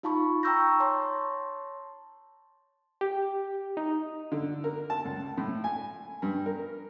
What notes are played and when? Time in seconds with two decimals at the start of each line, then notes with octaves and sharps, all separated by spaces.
0.03 D#4 F4 F5 A5 B5 C#6
0.43 G5 A#5 C#6 E6 G6 A#6
0.80 C#5 A5 C6
3.01 G4
3.77 D#4
4.32 D3
4.64 A#4
4.90 A5
5.05 C#2
5.38 A2
5.64 G#5
6.22 G2
6.46 A#4